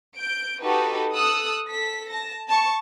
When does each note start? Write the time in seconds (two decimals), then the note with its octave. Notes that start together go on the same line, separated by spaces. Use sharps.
0.17 G6 D7
0.63 D#4 F#4 G4 A4 B4
1.13 A4 D#6 E6 F#6
1.69 A4 B6
2.12 A5 A#6
2.49 A5 C#6